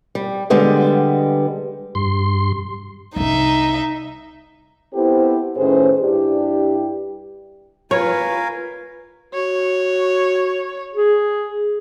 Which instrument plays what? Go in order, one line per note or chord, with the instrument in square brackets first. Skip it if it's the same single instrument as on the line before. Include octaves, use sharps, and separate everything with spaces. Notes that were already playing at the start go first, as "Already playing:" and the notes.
[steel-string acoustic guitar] G3
D3 G3 G#3 B3 D#5
[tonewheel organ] G2 C6
[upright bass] C2 D4 [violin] D#4 E5
[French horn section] B3 C4 E4 G4 A4 C5
A2 D#3 C#4 G#4 B4 C5
G2 D4 E4 G4
[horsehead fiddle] F4 B4 [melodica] A#4 F5 G#5 [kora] C#5
[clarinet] F#4 [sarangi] C#5
[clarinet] G#4